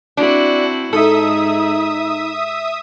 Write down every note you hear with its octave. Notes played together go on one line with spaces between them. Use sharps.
C4 D4 E4 F#4
G#2 D#4 A4 E5 D#6